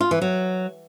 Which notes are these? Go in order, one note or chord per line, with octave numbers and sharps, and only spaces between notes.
F4
E3
F#3